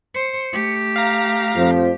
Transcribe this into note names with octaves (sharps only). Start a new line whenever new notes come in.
C5 C#7
A3 G4
F5 A#5
F2 F3